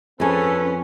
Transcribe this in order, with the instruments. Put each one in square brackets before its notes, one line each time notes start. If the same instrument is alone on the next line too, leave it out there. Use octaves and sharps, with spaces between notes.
[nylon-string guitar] F2 G#5 [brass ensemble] C4 B4 [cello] C#4 [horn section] G#4 A4